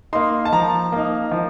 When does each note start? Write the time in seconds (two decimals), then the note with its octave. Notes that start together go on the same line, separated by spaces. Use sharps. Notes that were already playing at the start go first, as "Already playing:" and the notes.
0.13 A#3 D#4 C6
0.45 A5
0.52 F3 A#5
0.92 A#3 D#4
1.31 F3